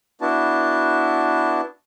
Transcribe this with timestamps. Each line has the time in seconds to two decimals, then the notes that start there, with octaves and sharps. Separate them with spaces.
0.21 B3 D4 E4 F#4 A5